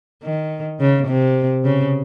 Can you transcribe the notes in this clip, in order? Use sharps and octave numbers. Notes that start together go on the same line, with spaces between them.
D#3
C#3
C3
C#3